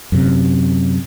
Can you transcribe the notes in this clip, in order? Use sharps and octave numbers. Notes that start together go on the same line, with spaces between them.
F#2 C3